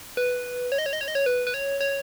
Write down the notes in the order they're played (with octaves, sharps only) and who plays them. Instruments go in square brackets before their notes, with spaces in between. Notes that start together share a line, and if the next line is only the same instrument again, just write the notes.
[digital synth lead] B4
C#5
D#5
C#5
D#5
C#5
D#5
C#5
B4
B4
C#5
C#5